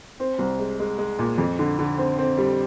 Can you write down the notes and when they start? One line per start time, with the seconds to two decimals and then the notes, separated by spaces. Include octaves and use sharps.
0.20 C4
0.39 C2
0.59 G#3
0.80 G#3
0.98 G#3
1.19 A#2
1.38 F2
1.59 D3
1.79 D3
1.98 C4
2.18 C4
2.38 G3